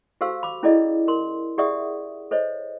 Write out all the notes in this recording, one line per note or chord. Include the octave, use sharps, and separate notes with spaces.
F#4 G4 A4 C5 F5 E6
B5 D6
C#4 E4 G#4 A4 D5 D#5
A#4 C6
G4 G#4 D5 E5 F#5 D#6
A4 C5 C#5 D#5